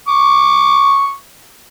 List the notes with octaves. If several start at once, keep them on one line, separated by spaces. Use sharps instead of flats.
C#6 D6